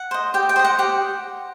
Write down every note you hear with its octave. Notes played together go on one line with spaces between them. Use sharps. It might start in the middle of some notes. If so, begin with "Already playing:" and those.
Already playing: F#5
C5 D#5
G4 G5
G5
C5 D#5
F#5
G4 F#5